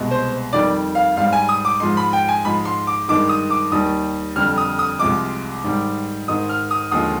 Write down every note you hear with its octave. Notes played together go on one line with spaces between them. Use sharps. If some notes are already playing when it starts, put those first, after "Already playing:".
Already playing: C2 B2 G#3
C5
F2 D#3 G3 D5
F5
G#2 G3 F5
G#5
D#6
D6
G#2 F3 G#3 C6
B5
G5
G#5
G#2 F3 G#3 B5
C6
D6
G2 D#3 G#3 D6
D#6
D6
D#2 D#3 G3 D#6
F2 D3 G3 F6
D#6
D#6
C2 C3 F3 G#3 D6
G#2 D#3 G3
G#2 D#3 G#3 D#6
F6
D#6
D#2 D3 F3 G#3 D#6